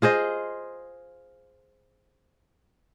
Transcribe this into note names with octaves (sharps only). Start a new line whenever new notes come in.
F4 G#4 C5 D#5